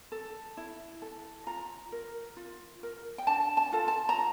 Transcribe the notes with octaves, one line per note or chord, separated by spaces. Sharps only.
A4
E4
A4
F4 A#5
A#4
F4
A#4
G5
D4 A5
A5
F4 A4
A5
A#5